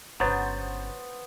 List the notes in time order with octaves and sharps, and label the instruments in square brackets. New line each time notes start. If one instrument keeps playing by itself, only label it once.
[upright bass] G1 C#3 [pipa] F#3 [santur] B3 [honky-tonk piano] C5 G6 A6